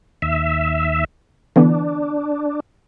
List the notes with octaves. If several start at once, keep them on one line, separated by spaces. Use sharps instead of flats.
D#2 E5
D3 E3 B3 D4